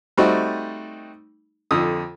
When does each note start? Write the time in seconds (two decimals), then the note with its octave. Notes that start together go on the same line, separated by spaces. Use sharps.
0.17 G3 A3 C4 D#4 F#4
1.71 F2 D3 D#6